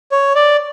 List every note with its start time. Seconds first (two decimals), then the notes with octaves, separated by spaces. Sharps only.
0.12 C#5
0.35 D5